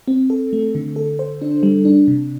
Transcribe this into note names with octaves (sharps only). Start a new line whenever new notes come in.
C4
A4
A3
D3
A4
C5
D4
G3
D4
C3